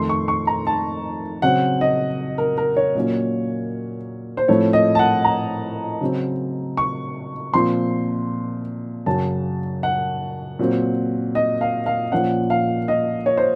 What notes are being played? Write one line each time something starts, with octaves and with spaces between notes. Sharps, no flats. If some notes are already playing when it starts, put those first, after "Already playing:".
Already playing: F2 D#3 A3 C6
C#6
C#6
A#5
A5
C#3 F#3 C4 F#5
D#5
A#4
A#4
C#5
A#2 F#3 A#3 C#4
C5
A2 F3 A3 C4 C#5
D#5
A5
F#5
A#5
C#3 F#3 C4
C#6
A#2 F3 C4 C6
F#2 C#3 F#3 A5
F#5
A#2 F#3 C4
D#5
F5
F5
A#2 F3 A#3 C#4 F#5
F5
D#5
C#5
C5